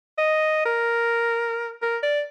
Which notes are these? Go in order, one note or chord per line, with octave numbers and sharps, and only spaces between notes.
D#5
A#4
A#4
D5